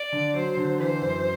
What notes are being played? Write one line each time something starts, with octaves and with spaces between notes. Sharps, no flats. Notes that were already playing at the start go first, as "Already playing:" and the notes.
Already playing: D5
D3
F#3 C5
D3
E3 C5
F#2